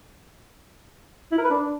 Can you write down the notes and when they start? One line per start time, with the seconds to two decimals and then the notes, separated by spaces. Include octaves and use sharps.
1.31 E4
1.38 A#4
1.44 B4
1.50 D4